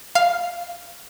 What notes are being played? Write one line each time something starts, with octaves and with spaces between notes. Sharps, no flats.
F5